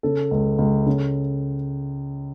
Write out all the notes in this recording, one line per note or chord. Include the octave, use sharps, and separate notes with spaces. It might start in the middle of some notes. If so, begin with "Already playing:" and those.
C#3 A4
C#2
C#2
C#3